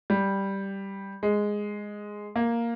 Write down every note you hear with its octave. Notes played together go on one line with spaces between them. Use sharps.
G3
G#3
A#3